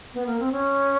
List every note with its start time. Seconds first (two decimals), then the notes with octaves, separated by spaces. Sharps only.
0.14 B3
0.27 A#3
0.40 C4
0.52 C#4